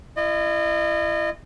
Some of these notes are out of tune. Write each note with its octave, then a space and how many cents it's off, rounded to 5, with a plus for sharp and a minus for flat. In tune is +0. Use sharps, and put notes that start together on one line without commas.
E4 +30 D#5 -35